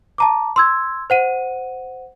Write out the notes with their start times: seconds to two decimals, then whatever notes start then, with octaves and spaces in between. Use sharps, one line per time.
0.18 A5 A#5 D6
0.56 C6 E6 G#6
1.10 C5 F#5 D#7